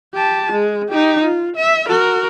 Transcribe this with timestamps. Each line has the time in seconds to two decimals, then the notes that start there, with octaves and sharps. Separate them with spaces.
0.13 G4 A5
0.52 G#3
0.89 D#4 G4
1.24 F4
1.56 E5
1.88 F#4 A#4